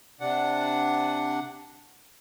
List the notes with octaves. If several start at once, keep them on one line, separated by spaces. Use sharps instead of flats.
C3 D4 F#5